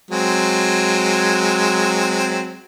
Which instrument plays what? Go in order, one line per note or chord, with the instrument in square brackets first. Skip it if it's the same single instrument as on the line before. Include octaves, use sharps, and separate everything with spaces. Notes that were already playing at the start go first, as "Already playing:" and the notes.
[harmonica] F#3 G#3 C4